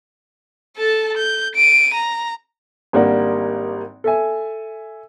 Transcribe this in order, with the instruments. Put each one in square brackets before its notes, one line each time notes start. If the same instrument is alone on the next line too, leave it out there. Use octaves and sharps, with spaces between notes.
[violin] A4 A5
G6
D7 D#7
A#5
[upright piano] G#1 G3 A#3 D4 F#5
A4 E5 G#5